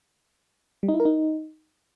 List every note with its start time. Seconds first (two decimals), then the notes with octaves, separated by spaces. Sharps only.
0.83 G3
0.89 D#4
0.94 E4
1.00 A#4
1.05 D#4